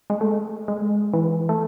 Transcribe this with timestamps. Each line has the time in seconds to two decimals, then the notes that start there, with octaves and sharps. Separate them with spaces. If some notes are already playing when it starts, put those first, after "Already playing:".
0.10 G#3
0.21 A3
0.68 G#3
1.14 E3
1.49 A3